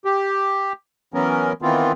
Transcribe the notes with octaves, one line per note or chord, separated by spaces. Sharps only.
G4
E3 F#3 B3 C#4 A#4
D#3 E3 B3 C4 F4